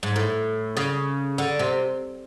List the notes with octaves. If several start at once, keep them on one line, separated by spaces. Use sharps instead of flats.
G#2
A2
C#3
D3
C3